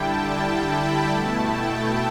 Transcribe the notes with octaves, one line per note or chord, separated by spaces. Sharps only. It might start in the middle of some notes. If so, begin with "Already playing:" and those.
Already playing: D3 G3 E4 G5 A5
A5
B5
B2 A3 E4 A5
G5